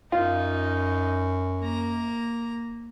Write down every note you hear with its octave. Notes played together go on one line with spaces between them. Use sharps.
F#2 D#4 F4
A#3 A#5